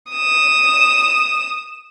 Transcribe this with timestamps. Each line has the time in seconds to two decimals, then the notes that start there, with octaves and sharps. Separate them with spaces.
0.12 D#6 E7